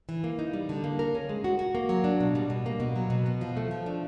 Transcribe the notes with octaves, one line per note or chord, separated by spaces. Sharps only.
E3
A#3
D#4
G3
D3
A#3
A#4
C#4
G#3
F#4
F#4
A#3
F#3
D4
B2
G3
B2
A#3
B2
F#3
B2
B3
F3
A3
F3
D4